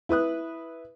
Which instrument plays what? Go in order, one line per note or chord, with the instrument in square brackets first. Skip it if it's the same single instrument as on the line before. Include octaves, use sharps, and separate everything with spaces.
[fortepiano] E4 B4 D#6 F#6